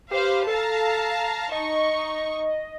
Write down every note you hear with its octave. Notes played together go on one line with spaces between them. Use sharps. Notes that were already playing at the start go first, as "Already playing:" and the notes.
G4 B4 C5 F5
A4 F5 A5 A#5
D#4 D#5 C#6